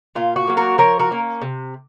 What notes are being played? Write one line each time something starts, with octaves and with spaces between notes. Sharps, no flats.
A#2 F4
F#4
F#3 A#3
F#4 A#4
F3 A#4 C#5
F#4 A#4
A#3 C#4
C3